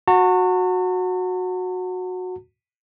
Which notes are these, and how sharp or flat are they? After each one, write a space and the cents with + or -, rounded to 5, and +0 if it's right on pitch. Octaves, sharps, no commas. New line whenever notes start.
F#4 -15 A5 +45